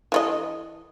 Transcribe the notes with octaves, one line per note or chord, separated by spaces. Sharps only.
E3 F4 D#5